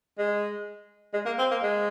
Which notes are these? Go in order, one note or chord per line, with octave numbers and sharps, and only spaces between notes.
G#3
G#3
A#3
C4
A#3
G#3